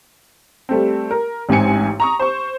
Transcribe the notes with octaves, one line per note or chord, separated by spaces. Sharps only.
G3 A3 C4
A#4
A1 G#2 C4 G#5 C#7
A#5 C#6 D#6
C5 C#6